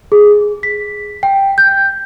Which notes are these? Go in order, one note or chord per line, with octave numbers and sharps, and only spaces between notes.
G#4
B6
G5
G6